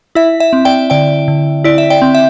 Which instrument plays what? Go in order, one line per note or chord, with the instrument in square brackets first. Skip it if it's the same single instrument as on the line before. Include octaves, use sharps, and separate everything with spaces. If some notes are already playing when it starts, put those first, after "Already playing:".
[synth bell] E4 E5
E5
C4
D5 G5
D3 D5 G5
D3
E4 D5
E5
D5 G5
C4
E5